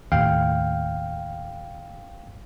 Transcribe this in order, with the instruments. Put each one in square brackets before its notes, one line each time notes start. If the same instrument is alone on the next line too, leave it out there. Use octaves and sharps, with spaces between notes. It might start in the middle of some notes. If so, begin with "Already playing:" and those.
[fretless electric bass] D#2 A2 [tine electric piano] F5 G5